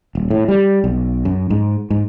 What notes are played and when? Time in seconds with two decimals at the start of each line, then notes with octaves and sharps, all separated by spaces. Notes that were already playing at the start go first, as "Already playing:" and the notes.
0.15 D#1
0.30 A2
0.48 G3
0.84 B1
1.25 F#2
1.50 G#2
1.90 G#2